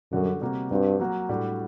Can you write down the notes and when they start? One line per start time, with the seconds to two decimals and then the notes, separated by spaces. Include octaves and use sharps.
0.12 F#2 D3 G3 D4 F#4
0.41 C3 G3 A#3 F#4
0.71 G2 G3 C4 F#4
1.00 F#3 A#3 F#4
1.29 A2 G3 D4 F#4